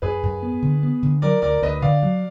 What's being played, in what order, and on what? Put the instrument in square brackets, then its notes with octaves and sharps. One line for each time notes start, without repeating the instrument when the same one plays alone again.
[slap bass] F#2 [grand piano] G#4 B4
[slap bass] F#2
B3
D3
B3
D3
[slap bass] F#3 [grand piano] A#4 D5
[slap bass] D2 [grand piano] A#4 D5
[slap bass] D2 [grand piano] B4 D#5
[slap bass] D3 [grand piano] D5 F5
[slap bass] F#3